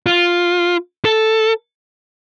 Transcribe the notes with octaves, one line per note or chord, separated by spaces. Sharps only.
F4
A4